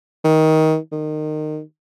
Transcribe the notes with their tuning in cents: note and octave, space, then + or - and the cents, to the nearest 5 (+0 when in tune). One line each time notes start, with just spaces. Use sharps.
D#3 +20
D#3 -25